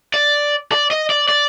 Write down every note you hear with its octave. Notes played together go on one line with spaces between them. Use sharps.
D5
D5
D#5
D5
D5